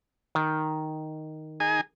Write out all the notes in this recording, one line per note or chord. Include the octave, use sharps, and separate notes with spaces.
D#3
D#4 G#4 G#5